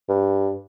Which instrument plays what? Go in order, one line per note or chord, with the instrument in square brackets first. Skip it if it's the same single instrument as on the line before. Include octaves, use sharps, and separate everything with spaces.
[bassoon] G2